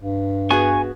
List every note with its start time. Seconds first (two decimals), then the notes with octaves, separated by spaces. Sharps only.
0.02 G2
0.50 B3 F#4 G#4 G#5 C#6